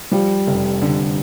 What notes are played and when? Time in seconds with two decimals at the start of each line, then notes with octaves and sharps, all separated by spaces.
0.11 F3 G3
0.47 F1
0.82 D3